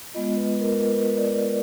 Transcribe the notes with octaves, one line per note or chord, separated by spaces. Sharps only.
G#3 B3 F4 D#5
B4
A#4
B4
B4
D5